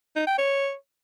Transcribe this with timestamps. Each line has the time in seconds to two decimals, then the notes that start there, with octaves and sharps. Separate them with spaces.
0.16 D#4
0.27 G5
0.38 C#5